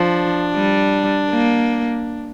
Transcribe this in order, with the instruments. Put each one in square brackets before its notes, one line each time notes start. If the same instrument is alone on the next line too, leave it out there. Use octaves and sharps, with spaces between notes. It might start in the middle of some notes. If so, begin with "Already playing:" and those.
Already playing: [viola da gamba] F3 [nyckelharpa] D4
[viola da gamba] G3
A#3